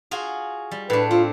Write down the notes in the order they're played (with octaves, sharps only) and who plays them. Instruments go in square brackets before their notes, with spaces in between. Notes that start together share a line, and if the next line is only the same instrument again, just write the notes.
[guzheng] F4 F#4 G#4
G3
[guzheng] A2 D4 [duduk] B4
[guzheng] C4 [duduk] F4